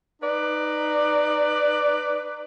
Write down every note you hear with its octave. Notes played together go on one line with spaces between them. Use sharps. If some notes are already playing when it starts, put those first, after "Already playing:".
D#4 B4 D5